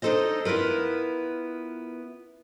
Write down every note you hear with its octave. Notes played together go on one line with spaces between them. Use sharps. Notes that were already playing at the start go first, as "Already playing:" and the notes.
D4 D#4 F#4 A4 C5 D#5
B3 E4 F4 A#4 B4